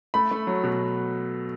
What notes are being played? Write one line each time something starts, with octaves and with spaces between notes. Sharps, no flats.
A3 B5
A3
F#3
B2